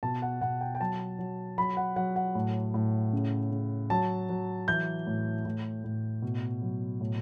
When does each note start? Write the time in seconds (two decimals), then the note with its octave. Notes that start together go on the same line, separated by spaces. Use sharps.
0.03 B2 A5
0.22 F#5
0.41 B2 F#5
0.61 G5
0.75 G5
0.80 F#3 A5
1.19 F#3
1.58 F#3 B5
1.77 F#5
1.96 F#3 F#5
2.16 F#5
2.35 A2
2.74 A2
3.13 C#3
3.51 C#3
3.90 F#3 A5
4.29 F#3
4.68 E3 G6
5.07 A2
5.45 A2
5.84 A2
6.22 B2
6.62 F#3
7.01 A2